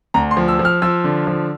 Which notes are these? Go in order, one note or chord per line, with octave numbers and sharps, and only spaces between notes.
D2 A#5
C6
F3
E6
F3
F6
F3 E6
D3
F3